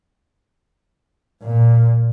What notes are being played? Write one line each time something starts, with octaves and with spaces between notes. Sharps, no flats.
A#2